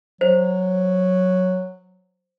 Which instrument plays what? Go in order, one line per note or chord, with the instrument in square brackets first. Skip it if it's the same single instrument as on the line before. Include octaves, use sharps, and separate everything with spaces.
[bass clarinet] F#3 [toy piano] C5